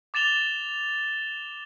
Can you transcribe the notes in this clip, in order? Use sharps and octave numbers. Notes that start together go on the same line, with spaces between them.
D6 A6 E7 F7 G7